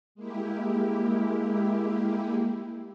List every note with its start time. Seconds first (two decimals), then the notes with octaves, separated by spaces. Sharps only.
0.15 G#3 A#3 E4 G4